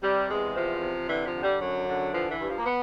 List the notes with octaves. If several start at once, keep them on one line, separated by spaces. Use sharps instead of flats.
C3 G3
E2 G#3
C3 F3
C3
D3 E3
F3
D3
G3
F#2 F#3
D3
E3 F3
E3
G2
F3
A#3
B3